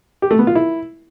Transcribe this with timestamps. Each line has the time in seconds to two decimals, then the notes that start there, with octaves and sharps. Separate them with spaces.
0.22 G4
0.31 A3
0.39 B3
0.47 F4
0.55 E4